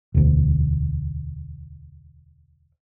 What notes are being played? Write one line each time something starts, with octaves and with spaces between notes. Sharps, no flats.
E1 D2